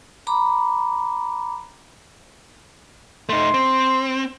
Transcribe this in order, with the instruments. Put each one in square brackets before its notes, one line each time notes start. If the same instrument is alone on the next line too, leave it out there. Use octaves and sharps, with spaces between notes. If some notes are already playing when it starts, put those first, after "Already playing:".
[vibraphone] A#5 B5 D6
[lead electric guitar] A3 D#4 [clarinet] C6
[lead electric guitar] C4